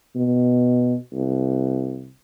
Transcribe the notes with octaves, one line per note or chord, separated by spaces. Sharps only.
B2
C2